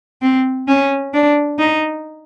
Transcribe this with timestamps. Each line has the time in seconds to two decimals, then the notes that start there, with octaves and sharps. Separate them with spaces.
0.22 C4
0.67 C#4
1.14 D4
1.59 D#4